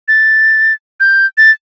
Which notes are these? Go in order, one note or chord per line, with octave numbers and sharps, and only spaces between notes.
A6
G6
A6